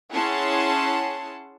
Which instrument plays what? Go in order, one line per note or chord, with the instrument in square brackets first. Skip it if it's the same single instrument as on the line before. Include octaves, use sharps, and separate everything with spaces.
[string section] C#4 E4 G#4 F#5 A5 C6